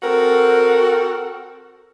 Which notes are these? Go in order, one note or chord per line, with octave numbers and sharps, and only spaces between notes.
C4 F#4 A4 A#4